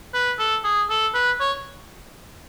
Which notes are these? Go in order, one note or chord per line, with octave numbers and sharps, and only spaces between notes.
B4
A4
G#4
A4
B4
C#5